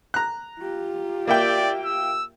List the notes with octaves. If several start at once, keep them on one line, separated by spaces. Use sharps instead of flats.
A#5 F#6
F4 G4
A#3 D5 E5 G5
E6